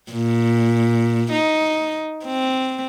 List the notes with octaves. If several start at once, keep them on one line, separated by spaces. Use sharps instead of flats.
A#2
D#4
C4